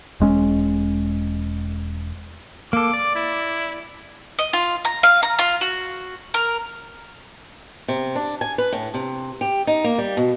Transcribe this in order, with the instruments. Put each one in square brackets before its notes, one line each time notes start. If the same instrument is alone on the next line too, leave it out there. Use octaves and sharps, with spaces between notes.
[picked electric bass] E1 G#3 C#4
[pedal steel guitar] A#3 A4 [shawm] D6
[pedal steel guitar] D5
[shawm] E4
[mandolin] D#5
F4
A#5
F5
A#5
F4
F#4
A#4
[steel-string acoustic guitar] C3
D4
G#5
B4
A2
C3
G4
D#4
A#3
G3
B2